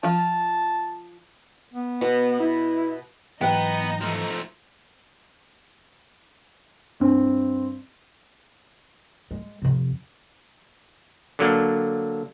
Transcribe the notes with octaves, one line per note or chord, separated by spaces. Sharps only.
F3 F4 A5
B3
B2
E4
G#2 E3 F#3 B3 D#4 B4 G5
F3 A3
G2 C4
G#3
F2 C3
D3 F#3 A#3 D4